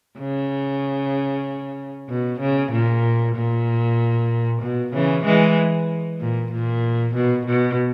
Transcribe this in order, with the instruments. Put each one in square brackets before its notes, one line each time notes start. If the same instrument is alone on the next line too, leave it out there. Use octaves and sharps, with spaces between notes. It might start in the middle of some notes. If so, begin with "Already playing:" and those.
[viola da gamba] C#3
B2
C#3
A#2
A#2
B2
C#3 E3
E3 G#3
A#2
A#2
B2
B2